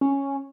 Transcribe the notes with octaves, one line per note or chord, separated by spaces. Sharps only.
C#4